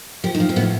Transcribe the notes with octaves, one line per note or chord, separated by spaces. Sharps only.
F3 G4
D#4
F3
C4
A2 B3